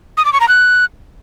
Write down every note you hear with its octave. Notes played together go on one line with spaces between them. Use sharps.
D#6
D6
C#6
A#5
F#6